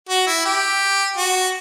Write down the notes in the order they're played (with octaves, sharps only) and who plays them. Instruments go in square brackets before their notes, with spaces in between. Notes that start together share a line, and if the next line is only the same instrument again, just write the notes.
[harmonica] F#4
E4
G4
F#4